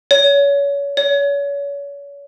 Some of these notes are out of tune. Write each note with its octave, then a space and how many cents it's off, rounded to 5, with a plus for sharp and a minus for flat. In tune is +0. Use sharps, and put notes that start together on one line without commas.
C#5 +30
C#5 +35